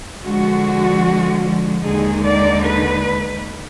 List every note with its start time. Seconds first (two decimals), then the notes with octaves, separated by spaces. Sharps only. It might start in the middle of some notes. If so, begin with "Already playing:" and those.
0.25 D3 F3 G#3 F#4
1.84 D#2 D3 G#3 D#4 G#4
2.24 D5
2.64 B4